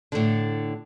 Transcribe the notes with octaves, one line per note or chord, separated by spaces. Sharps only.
A2 D3